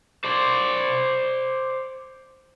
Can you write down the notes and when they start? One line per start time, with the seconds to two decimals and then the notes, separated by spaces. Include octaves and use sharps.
0.24 C5 D5